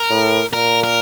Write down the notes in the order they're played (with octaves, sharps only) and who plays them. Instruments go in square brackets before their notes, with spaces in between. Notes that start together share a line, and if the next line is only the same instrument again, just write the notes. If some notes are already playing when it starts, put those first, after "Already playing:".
Already playing: [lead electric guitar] A#4
[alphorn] A2
[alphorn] A#2 [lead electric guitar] A#4
[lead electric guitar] A#4